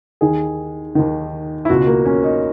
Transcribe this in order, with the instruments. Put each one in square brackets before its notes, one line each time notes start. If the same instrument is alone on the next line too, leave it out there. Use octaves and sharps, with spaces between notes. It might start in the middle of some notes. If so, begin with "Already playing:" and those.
[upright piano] D#2 D#3 G#4
D#2 D#3
E4
C#2 B2 F#4
A#3
C#4
D#4